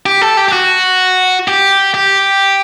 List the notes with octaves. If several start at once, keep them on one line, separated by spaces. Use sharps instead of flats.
G4
A4
G4
G4
F#4
G4
G4